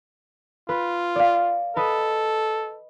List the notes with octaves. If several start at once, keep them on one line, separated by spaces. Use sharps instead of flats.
F4 B4
D5 F5
A4 B4 D#5